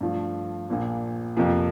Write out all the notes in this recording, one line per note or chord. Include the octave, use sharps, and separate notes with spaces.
G2 F3 A3
A#1 A#2 F3
F2 C3 F3 A#3